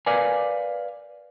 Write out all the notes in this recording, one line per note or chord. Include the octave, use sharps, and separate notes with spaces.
A#4 B4 D5 F5 G#5